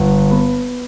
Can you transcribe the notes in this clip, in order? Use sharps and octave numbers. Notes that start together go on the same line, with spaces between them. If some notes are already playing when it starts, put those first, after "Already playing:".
Already playing: G1
B3